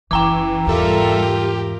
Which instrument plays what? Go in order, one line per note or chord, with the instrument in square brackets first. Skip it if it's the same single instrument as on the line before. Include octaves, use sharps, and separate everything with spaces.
[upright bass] F#1 C#4 [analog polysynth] E3 [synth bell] G5 A#5 D6
[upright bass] E2 G#2 [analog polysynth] G3 A4 E5 [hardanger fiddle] F4 A#4
[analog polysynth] G4